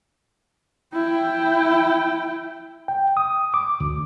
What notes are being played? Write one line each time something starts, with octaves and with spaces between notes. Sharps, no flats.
E4 G5
G5
D#6
D6
D2